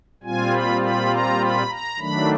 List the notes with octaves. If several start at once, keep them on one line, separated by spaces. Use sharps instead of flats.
A#2 G3 C4 F4 G#5
B5
B5
A#5
B5
A#5
D#3 F#3 A3 D4 B5